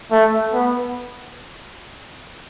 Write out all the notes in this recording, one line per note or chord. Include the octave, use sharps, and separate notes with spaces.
A3
B3